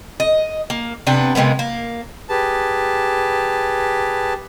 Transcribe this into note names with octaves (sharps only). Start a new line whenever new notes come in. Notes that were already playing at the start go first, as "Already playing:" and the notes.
D#5
A#3
C3 B3 D4 B4
C3 G#3 A#3 B3
A#3
G4 G#4 B4 A5